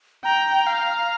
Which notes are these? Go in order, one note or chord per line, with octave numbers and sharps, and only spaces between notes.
G5 A#5
F5